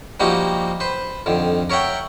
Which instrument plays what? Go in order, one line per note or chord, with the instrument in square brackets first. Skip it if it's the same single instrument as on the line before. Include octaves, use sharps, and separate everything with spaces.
[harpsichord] F3 G3 A#3 D#4 F#4 G4
B4 C5
F2 D3 D#3
A#4 C#5 E5 F#5 G5